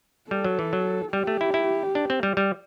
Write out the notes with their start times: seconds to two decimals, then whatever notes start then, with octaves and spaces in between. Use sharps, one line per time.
0.31 G3 A4
0.44 F#3
0.59 E3
0.73 F#3
1.13 G3 G4
1.27 A3
1.41 E4
1.54 E4
1.95 D4
2.10 C4
2.23 G3
2.37 G3